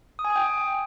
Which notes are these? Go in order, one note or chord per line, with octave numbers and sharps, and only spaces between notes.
D#6
G#5
D#6
G5